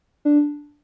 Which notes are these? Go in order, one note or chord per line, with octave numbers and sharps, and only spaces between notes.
D4